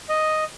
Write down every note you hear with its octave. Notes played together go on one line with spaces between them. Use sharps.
D#5